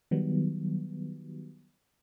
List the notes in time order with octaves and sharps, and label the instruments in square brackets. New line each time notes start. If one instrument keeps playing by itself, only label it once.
[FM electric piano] D#3 F#3 G3 B3